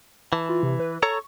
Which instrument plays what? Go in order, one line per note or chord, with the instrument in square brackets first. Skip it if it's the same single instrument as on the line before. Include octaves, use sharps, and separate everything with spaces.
[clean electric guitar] E3 [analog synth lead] A5
[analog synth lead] F4
C3
B4
[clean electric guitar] A4 C#5 A#5 [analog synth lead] C#6